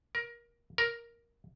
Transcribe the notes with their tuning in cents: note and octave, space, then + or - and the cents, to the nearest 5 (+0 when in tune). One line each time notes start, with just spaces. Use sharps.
A#4 +20
A#4 +5